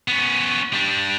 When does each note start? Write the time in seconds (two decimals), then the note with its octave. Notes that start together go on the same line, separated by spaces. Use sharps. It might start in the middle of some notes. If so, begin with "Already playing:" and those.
0.08 B3 C#4
0.73 G3 D4